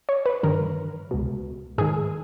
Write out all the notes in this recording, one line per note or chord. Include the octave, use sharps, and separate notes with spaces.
C#5
B4
G2 D#3 A#4
C#2 B2
G#2 D#3 G#4